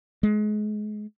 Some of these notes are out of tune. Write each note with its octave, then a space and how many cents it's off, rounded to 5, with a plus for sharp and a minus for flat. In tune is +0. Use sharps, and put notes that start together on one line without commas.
G#3 +30